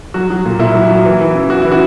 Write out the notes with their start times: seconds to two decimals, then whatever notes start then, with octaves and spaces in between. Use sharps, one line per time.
0.14 F#3 F#4
0.30 F#3
0.45 A#2
0.59 A#2 E4
0.74 F#3
0.91 F#3
1.05 E3
1.20 E3
1.35 C#3
1.50 C#3 F#4
1.62 E3 E4
1.71 F#4